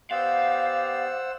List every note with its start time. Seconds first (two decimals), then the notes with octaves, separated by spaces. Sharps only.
0.11 B3 G4 C5 D5 F5 F#5 E6